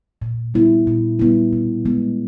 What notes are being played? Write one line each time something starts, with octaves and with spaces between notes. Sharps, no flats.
A#2
G3 B3 E4
A#2
G3 B3 E4
B2
G#3 B3